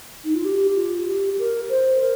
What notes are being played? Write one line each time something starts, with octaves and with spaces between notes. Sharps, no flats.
D#4
F4
G4
F4
G4
A#4
C5
A#4